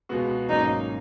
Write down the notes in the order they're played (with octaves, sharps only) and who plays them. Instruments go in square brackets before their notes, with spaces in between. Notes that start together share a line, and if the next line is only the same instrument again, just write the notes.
[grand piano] C#2 B2 G#3 B3 F#4
[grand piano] G#1 G#2 F#3 A#3 C#4 [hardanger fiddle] D#4